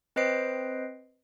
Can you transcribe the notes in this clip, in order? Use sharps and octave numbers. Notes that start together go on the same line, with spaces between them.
C4 B4 C5 D#5 C7 D7